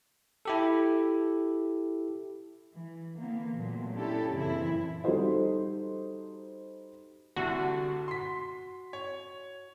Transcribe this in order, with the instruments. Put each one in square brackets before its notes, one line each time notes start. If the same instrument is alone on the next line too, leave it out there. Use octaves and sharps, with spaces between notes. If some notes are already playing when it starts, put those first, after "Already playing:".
[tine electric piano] E4 G4 A4
[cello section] E3
D3 E3 A#3 B3
A#2 F#3 A3
C#4 D4 E4 G4 A4
F#2 A#2 C#3 E3 C4 E4
[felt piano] G3 D#4 F#4 A4 C5 D#5
[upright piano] C2 D3 A3 [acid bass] F#4
[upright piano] C6 B6
C#5